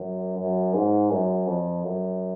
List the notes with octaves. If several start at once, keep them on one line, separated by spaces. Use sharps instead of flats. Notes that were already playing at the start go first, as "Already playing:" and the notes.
Already playing: F#2
F#2
G#2
F#2
F2
F#2